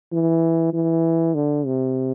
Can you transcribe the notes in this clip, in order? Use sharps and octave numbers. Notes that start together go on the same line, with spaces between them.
E3
E3
D3
C3